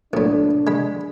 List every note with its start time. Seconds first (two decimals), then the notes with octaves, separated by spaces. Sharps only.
0.13 B1 A2 D4
0.67 G#3 B5